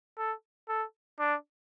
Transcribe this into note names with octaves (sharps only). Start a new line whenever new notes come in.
A4
A4
D4